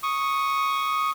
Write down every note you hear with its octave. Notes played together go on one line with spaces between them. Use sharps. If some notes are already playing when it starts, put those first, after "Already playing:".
C#6 D#6